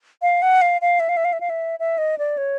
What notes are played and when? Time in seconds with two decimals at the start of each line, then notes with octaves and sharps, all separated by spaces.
0.22 F5
0.42 F#5
0.62 F5
0.81 F5
1.00 E5
1.09 F5
1.17 E5
1.25 F5
1.33 E5
1.41 F5
1.50 E5
1.80 E5
1.98 D#5
2.18 D5
2.38 C#5